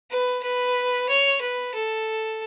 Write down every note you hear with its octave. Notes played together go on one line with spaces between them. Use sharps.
B4
B4
C#5
B4
A4